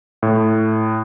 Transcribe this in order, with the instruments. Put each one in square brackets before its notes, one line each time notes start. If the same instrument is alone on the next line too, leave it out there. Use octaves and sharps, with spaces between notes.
[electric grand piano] A2